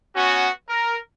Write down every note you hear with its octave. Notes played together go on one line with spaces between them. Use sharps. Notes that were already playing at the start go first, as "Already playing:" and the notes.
B3 C#4 F#4
A#4